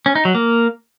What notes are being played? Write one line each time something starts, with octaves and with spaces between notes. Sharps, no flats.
C#4
D#4
F#3
A#3